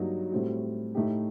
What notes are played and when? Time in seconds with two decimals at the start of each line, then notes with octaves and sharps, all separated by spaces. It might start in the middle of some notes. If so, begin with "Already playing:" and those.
Already playing: G2 F#3 A#3 D#4 F#4
0.32 A2 G3 C4 F#4
0.95 A2 A3 D#4 G4